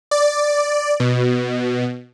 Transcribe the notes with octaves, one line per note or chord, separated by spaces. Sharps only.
D5
B2